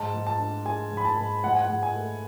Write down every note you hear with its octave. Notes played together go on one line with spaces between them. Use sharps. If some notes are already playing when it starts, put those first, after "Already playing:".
Already playing: G#2 A5
G#2
A5
D4
G#3 G#5
G#2
B5
A5
G#2
G#2 F#5
G#5
F#5
G#2
G#5
A3